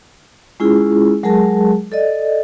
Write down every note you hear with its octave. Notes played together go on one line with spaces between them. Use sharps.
G#3 C#4 E4 F4 G#4
F#3 G#3 G#4 A#4 A5
A4 D5 D#5